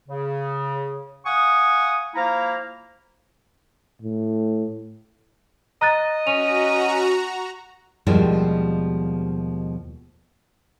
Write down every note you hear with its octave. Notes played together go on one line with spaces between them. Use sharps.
C#3
F5 F#5 G#5 C#6 D#6
F3 A#3 E4 F5 A#5
A2
D#5 A#5 F#6 A6
C#4 F#4 A#5 F7
D#2 B2 F3 G3 G#3 E4